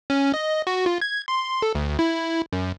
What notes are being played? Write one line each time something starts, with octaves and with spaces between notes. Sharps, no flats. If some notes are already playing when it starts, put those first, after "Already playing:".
C#4
D#5
F#4
F4
G#6
C6
A4
D2
E4
F#2